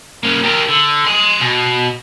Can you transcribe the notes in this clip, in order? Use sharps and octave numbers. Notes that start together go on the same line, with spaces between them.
A#3 C#4
G4 A#4
D3
G#5 C6
B2